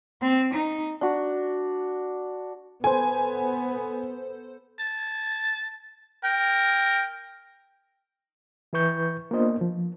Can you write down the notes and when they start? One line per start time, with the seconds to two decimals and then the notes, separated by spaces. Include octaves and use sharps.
0.22 C4
0.53 D#4
1.01 D4 F#4
2.84 B3 A4 C5 G#5
4.79 A5
6.24 A#4 G5
8.73 E3 E4 B4 C#6 G6
9.31 A#3 B3 D4 F4 C5 D#5
9.61 F3